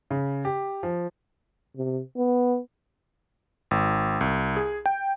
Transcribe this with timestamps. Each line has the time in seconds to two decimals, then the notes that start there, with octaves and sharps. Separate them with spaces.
0.11 C#3
0.45 G4
0.83 F3
1.77 C3
2.17 B3
3.71 G#1
4.21 C2
4.57 G#4
4.86 G5